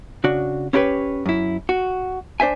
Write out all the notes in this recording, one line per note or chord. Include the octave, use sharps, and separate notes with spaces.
C#3 D4 F#4
C#4 E4 F#4 G4 B4 C#5
F#2 E4
F#4
D4 C5 E5 G#5